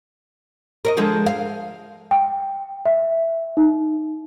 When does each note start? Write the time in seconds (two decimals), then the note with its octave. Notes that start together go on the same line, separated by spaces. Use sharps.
0.85 A#4 C#5 D#5
0.97 D3 F3 G#3
1.26 F5
2.11 G5
2.86 E5
3.57 D#4